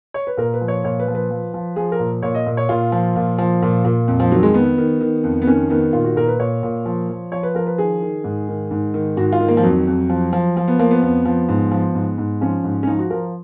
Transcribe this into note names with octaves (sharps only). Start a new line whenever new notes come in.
C#5
B4
A#2 A#4
B4
F3
C#5
A#2 C#5
B4
F3
B4
F3
F3
F3 G#4
A#4
A#2
A#2 C#5
D#5
A#2
C#5
A#2 F4
F3
A#2
F3
A#2
A#2
F2
F3
D#3 F#3
G#3
D#3 B3
D#3
D#3
F2
B3
D#3 C#4
D#3 B3
A#2 F4
F#4
A#2 A#4
B4
A#2 C#5
A#2
F3
F3
F3 C#5
B4
F3 A#4
B4
D#3 G#4
D#3
G#2
D#3
G#2
D#3
G#2 F#4
F4
D#3
A#3
F3
F2 F#3
F2
F3
F3
F3
B3
F3 A#3
B3
F2 B3
F3
G#2
F3
G#2
G#2
F3 C#4
G#2
C#4
F3 D#4
F#4
F3 A#4